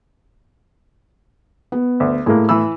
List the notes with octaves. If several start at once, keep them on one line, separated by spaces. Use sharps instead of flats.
B3
D2
A2 G#3 A#3
E3 B5 E6